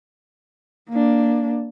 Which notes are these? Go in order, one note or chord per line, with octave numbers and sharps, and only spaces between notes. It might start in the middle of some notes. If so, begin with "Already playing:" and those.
A#3 D4